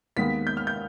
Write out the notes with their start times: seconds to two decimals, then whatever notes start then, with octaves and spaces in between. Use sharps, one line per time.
0.16 D#2 D#3 G#3 B3 B6
0.47 G6
0.57 F6
0.67 G6